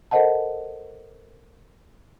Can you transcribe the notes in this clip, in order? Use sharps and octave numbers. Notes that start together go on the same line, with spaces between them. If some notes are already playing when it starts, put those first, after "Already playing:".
A4 A#4 C5 D#5 F#5 A5